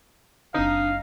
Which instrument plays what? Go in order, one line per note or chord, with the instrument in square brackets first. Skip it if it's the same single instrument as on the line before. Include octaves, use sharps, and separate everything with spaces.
[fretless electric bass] F#1 C4 [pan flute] D4 [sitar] D#4 [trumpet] F5